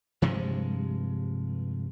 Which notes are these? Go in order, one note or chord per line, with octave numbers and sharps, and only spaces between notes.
G2 C3 F3 G#3